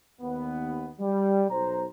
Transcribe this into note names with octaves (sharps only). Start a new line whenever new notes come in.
D#2 B3
G3
B1 C5 A#5